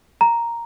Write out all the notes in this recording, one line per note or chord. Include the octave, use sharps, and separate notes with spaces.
A#5